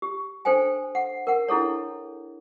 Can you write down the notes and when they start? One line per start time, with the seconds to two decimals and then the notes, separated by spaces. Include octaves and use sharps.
0.02 G4
0.45 D4 A4 C5 G5 G#5
0.95 F#5
1.27 A#4 F#5
1.48 D4 E4 G#4 A4 C#5